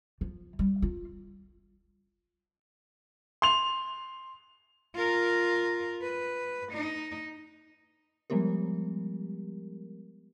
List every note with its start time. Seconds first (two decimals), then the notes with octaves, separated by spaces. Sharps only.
0.21 F3
0.59 G3
0.82 F4
3.42 C6 F7
4.95 F4 A#4
6.02 B4
6.72 D#4
8.30 F3 G3 G#3 B3 G4 A#4